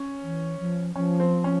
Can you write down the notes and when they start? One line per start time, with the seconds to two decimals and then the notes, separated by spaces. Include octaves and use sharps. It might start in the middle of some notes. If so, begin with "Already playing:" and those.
Already playing: C#4
0.23 E3
0.60 F3
0.96 F3 C#4
1.20 C4
1.44 C#4